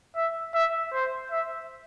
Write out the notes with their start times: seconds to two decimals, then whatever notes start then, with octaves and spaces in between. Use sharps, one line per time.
0.16 E5
0.54 E5
0.93 C5
1.31 E5